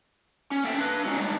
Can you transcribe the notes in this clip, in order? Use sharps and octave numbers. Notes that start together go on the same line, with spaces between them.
C#4
A#3 C#4 A4 E5 G5
D4 B4
F#3 G#3 C#4 D#4
G3 G#3 D4 D#4